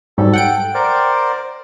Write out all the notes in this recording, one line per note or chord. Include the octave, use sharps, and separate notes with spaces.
G#2 F#3 G3 A4
F#5 G5 D7
A#4 C5 D5